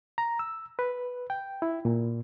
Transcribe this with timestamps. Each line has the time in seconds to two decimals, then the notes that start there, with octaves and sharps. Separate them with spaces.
0.18 A#5
0.39 E6
0.79 B4
1.30 G5
1.62 E4
1.85 A#2